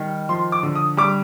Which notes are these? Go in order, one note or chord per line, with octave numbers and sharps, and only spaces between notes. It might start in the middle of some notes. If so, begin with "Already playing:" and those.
Already playing: D#3 G3
F3 C6
D6
D3
D#6
G3 D6